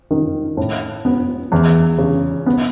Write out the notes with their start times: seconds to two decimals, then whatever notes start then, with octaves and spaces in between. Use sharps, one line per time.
0.11 D#3
0.57 A2
1.05 B3
1.52 E2
1.98 C#3
2.46 B3